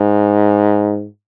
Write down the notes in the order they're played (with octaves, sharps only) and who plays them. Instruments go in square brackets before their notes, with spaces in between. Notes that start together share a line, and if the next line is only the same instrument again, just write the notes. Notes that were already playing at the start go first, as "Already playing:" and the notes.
Already playing: [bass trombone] G#2